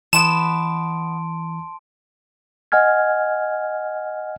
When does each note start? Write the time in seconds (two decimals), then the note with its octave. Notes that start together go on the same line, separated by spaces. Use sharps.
0.13 E3 G#3 B3 A5 C6 D7 E7
2.72 D#5 F#5 G#5 F6 G#6